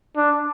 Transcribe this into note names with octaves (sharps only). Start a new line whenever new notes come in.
D4